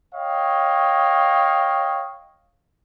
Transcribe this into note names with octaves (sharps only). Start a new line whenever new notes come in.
C#5 D#5 F5 G5